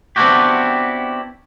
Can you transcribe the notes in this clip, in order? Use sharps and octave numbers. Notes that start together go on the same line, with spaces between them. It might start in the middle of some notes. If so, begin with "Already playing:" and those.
B3 C4 D4 E4 F#4 G4